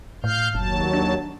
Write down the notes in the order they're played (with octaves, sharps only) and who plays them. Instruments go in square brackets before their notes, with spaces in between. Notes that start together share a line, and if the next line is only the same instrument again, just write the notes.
[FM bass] A2 [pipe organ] F5 F6 G6
[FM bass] F#1 [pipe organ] D#2 F#3 A5
[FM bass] D4